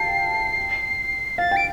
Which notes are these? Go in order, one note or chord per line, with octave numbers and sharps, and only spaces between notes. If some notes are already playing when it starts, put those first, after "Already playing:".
Already playing: F5 G5 A5 C7
F5 A6
G5
D7